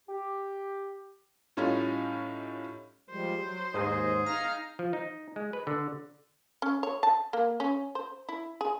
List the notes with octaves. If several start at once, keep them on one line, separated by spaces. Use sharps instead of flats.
G4
A2 G3 C#4 D#4 F4
F3 G3 G#3 C5
F#3
D#2 G#2 D#4 G#4 D#5
D#4 F5 A#5 F6
F3
D#4
G#3
B4
D3
C#4
C#5
A5
A#3
C#4
C5
E4
G#4